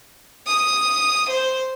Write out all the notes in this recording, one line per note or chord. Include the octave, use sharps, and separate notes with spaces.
D#6
C5